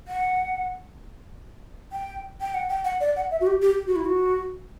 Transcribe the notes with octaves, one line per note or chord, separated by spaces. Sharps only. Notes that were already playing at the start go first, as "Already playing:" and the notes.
F#5
G5
G5
F#5
G5
F#5
D5
F#5
E5
F#4
G4
G4
G4
F#4
E4
F#4